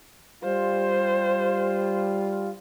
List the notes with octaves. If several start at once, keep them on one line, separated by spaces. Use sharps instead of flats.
G3 F4 C5